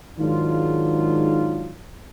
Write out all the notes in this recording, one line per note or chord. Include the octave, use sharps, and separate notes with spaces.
G#2 D#3 F#3 G#3 D4 F4